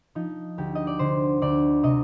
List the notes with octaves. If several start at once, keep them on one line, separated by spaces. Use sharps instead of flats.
F3 D#4
D2 G4
D#5
D5
D3 C5
D2 D5
C3 D#5